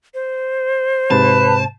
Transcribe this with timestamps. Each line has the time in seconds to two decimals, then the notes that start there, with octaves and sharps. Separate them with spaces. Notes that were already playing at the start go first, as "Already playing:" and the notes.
0.14 C5
1.11 G#2 C3 B4 A5